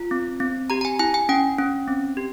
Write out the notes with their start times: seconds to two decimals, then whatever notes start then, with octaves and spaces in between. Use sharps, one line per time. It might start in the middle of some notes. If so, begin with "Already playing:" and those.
Already playing: F4
0.11 C4
0.40 C4
0.70 G4 A#5
0.81 A#5
0.85 G#5
0.99 E4 G#5
1.14 G#5
1.29 C#4 G5
1.59 C#4
1.88 C4
2.17 G4